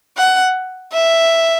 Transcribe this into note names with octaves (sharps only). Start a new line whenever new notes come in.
F#5
E5